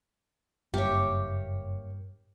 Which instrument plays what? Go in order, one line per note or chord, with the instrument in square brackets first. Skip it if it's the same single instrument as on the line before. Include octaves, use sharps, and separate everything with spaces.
[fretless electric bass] F#1 [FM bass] G2 [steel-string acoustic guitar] A#3 C#5 [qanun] G4 E5